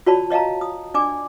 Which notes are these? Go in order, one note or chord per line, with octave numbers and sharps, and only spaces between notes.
F4 F#4 C#5 D5 A5 B5
C#5 D#5 F5 A5 A#5
D#6
D4 D5 G#5 D6